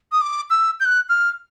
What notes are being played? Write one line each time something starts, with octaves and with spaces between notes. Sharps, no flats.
D#6
D6
E6
G6
F#6
F6